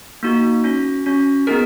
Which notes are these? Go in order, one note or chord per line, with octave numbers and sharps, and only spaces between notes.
A#3 D#4 F#4
C#4 F#4
C#4 F#4
B3 D#4 G#4 A#4